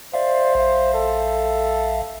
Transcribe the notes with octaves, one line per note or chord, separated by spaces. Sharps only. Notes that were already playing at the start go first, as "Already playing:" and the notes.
C5 D5 E5 F5
A#1 E5 F5
A4